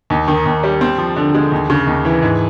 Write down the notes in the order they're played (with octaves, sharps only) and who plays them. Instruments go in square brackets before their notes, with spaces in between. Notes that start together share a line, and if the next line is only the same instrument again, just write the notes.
[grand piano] D#2
D#3
D#2
G3
C4
F3
D3
G#3
D#2
C#3
D#2
E3
G#2